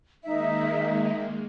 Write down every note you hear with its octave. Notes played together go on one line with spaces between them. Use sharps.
D#3 G#3 A#3 D#4 E5